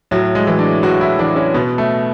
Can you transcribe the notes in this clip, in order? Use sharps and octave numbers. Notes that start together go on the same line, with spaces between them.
A2 F#3
G#3
E3
D4
A2 F#4
E4
E3 D4
C#4
B2 B3
A3